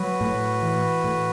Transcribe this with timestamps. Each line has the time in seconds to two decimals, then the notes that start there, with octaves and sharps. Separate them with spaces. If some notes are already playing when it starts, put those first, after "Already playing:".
Already playing: F#3 F#4 B4
0.21 A2
0.62 E3
1.04 A2